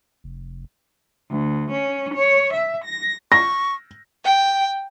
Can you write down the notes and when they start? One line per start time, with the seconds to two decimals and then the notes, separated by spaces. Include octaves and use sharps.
0.24 F1
1.30 D2
1.72 C#4
2.15 C#5
2.54 E5
2.85 A#6
3.32 C#6 A#6
4.23 G5